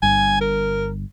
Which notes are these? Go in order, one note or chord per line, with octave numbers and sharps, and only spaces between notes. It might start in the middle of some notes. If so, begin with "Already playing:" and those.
G1 G2 G#5
A#4